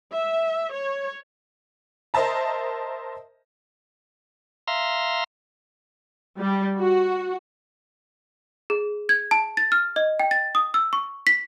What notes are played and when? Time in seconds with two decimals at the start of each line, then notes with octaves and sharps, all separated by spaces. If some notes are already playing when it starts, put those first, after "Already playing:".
0.13 E5
0.75 C#5
2.14 A#4 C5 D#5 E5 A5 A#5
4.68 E5 F5 A#5 C6
6.39 G3
6.78 F#4
8.70 G#4
9.09 G#6
9.31 A5
9.57 A6
9.72 F6
9.96 D#5
10.20 G5
10.31 A6
10.55 D#6
10.74 E6
10.93 C#6
11.27 B6